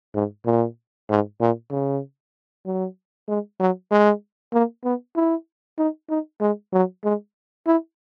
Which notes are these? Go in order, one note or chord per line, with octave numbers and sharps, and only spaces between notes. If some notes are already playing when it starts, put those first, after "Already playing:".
G#2
A#2
G#2
A#2
C#3
F#3
G#3
F#3
G#3
A#3
B3
E4
D#4
D#4
G#3
F#3
G#3
E4